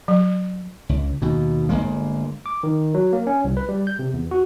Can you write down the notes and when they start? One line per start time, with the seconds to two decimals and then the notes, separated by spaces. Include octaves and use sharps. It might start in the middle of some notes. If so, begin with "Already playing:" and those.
0.08 F#3
0.89 C#2
1.22 D#2 B2
1.69 G1 F#2 G#3 A#3
2.46 D6
2.63 D#3
2.94 F#3
3.13 A#3
3.27 C#4
3.44 C2
3.57 B4
3.69 G3
3.87 G6
3.99 C3
4.13 E2
4.31 F#4